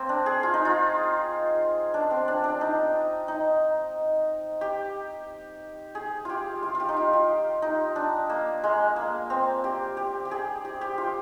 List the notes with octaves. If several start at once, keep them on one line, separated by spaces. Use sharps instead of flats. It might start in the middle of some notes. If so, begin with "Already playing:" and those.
Already playing: A#3 C4
D4
G#4
F4
D#4
F4
D4
C4
D4
D4
D#4
D#4
G4
G#4
F4 G4
F4
F4 G4
D#4
F4
G4
D#4
D4
A#3
G#3
A#3
C4
G4
G4
G4
G#4
G4
G4
F4